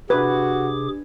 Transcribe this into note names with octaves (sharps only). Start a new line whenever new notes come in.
C3 D4 F#4 G#4 B4 D6 G#6